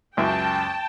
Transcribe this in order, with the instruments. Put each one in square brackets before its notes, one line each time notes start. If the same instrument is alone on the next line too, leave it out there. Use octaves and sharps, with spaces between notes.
[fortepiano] C#2 F#2 E5 [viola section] G5 A5